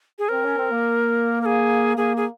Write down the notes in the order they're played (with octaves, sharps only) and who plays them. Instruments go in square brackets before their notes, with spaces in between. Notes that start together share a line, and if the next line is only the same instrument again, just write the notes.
[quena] G#4
[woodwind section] C4 [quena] A#4
[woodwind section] C#4
C4
A#3
[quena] A#4
G#4
[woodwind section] A#3 [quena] G#4
[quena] G#4